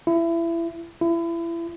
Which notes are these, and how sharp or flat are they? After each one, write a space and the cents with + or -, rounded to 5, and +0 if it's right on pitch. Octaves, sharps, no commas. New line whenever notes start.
E4 +25
E4 +30